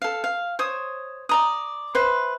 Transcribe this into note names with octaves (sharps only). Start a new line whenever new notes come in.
A4 F5
F5
C5 C#5 D#6
D5 A#5 D#6
B4 C5 E5